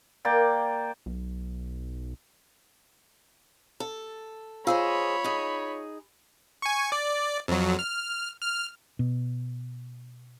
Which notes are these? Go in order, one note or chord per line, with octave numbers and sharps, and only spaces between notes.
A#3 D5 G5
B1
A4
F4 G#4 C5 C#5 D#5 F5 B5 E6
D#4 G#4
G#5 C#6
D5
F2 F#3
F6
F6
B2